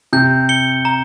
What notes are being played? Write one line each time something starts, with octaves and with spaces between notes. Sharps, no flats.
C3 G6
C#7 G7
A#5